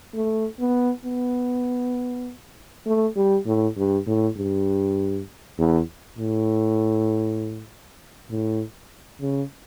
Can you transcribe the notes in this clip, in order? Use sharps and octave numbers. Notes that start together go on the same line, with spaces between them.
A3
B3
B3
A3
G3
A2
G2
A2
G2
E2
A2
A2
C#3